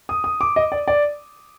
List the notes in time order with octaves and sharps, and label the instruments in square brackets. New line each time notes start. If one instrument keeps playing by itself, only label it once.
[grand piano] D#6
D#6
D6
D#5
D5
D5